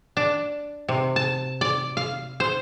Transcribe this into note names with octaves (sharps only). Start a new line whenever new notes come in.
D4
C3
A5
D5
F5
C5